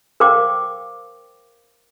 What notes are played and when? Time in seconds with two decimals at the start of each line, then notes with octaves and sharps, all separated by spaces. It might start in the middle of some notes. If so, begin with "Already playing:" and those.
0.20 A#4 C5 F5 G5 D6